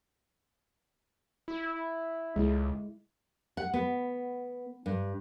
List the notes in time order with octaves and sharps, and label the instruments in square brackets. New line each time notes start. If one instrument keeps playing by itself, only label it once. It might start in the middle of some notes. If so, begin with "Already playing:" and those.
[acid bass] E4
[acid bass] C#2 [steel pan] G#3 E4
[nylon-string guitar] F#5
B3
G2